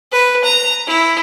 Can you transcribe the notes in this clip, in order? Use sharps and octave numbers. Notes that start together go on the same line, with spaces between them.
B4
A#5
E4